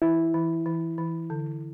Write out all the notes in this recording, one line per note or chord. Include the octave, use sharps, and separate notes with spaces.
E3 E4
E3
E3
E3
D3